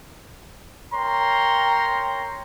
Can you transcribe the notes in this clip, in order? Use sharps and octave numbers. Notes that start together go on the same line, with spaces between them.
A#4 C#5 G5 A#5 C6